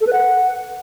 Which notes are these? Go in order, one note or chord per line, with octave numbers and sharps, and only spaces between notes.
A4
B4
F#5